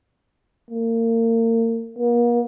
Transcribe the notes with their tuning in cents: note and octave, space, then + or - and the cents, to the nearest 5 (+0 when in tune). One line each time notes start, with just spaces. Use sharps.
A#3 -35
A#3 +40